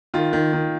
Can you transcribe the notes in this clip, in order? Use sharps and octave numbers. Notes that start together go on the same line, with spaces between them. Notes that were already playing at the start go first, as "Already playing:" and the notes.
D#3 F4
D#3
D#3